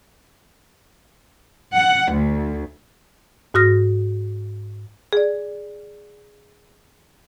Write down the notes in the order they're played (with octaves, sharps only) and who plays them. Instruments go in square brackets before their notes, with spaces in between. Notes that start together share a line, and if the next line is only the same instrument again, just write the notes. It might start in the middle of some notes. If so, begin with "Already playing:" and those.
[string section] F#5
D2
[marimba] G#2 F#4 D#6 F6 A#6
G#4 D5